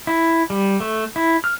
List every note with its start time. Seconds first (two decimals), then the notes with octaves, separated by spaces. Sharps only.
0.07 E4
0.50 G3
0.80 A3
1.16 E4
1.44 F6